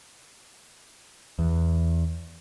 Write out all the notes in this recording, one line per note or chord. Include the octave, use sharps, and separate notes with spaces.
E2